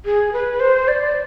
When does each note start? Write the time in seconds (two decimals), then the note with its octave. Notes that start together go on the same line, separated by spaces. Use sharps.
0.05 G#4
0.33 B4
0.60 C5
0.88 D5